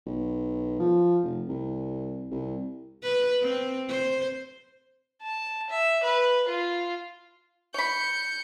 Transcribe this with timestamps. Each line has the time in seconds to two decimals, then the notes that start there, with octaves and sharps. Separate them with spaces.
0.06 B1
0.79 F3
1.23 F1
1.49 C2
2.31 C2
3.03 B4
3.41 C4
3.89 C5
5.22 A5
5.70 E5
6.04 B4
6.48 F4
7.74 C#5 B5 G6 C#7